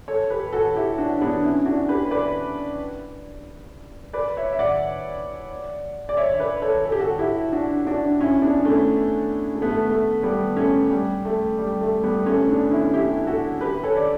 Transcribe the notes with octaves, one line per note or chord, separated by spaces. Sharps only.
A4 C#5
G4 B4
F#4 A4
E4 G4
D4 F#4
B3 D4
C#4 E4
D4 F#4
G4 B4
B4 D5
B4 D5
C#5 E5
E5
D5 F#5
D5
C#5 E5
B4 D5
A4 C#5
A4
G4
F#4 A4
E4 G4
D4 F#4
D4 F#4
C#4 E4
B3 D4
A3 C#4
A3
B3
A3
A3
G3 B3
A3 C#4
G3
A3
G3
A3
G3 B3
A3 C#4
B3 D4
C#4 E4
E4 G4
F#4 A4
G4 B4
A4 C#5
D5